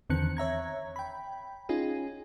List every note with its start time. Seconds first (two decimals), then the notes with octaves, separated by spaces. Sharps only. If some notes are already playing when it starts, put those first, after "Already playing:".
0.10 E2 D3 D#3 C4 F#6 C#7
0.37 C#5 E5 A#5 G#6
0.96 G5 B5
1.69 C#4 D#4 F4 G#4